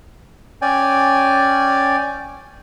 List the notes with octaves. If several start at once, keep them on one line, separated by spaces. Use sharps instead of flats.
C#4 D5 G5 G#5